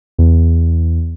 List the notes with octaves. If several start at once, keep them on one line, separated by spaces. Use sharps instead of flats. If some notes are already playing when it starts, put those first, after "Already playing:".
E2